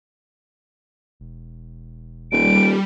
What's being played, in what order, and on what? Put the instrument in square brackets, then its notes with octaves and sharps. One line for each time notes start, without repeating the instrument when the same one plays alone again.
[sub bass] E1
[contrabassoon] D#1 [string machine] G3 [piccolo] D7